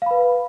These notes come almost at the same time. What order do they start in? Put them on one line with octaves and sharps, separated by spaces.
F5 B5 B4